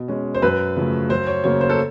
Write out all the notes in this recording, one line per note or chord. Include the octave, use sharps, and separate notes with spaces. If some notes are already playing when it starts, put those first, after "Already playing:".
Already playing: B2
G#3 C#4
C5
F#2 B4
C#3 F3 A3
F#2 C5
C#5
C#3 F#3 A#3 C#5
C5
A4